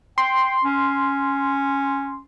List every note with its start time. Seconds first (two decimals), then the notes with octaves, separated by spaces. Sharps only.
0.18 G5 C6
0.64 C#4